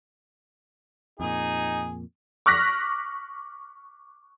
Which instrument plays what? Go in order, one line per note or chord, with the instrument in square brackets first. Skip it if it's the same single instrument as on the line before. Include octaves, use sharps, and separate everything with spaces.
[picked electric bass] F2 A#2 [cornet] D#4 [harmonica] G#4
[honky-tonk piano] C#6 D6 F6 F#6 A#6 B6